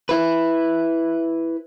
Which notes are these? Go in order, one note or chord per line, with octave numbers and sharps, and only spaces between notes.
E4 B4